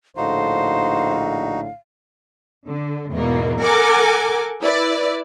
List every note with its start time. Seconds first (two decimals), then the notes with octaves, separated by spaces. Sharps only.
0.17 A#1 A2 D3 D#4 F#4 C5 F5
2.68 D3
3.11 E2 G#2 B2 A#3
3.63 A4 A#4 F#5 G#5 D6
4.61 E4 B4 D5